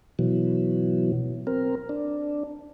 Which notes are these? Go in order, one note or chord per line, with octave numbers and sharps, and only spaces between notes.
B2 E3 F#3
C4 A#4
D4